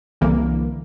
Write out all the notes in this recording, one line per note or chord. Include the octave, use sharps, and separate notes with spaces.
C2 D3 E3 A#3